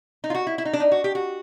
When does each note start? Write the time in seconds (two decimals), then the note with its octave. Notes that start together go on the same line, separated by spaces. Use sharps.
0.24 D#4
0.30 F4
0.35 F#4
0.47 E4
0.58 E4
0.65 D#4
0.73 D4
0.80 D#4
0.92 F#4
1.04 G4
1.15 F#4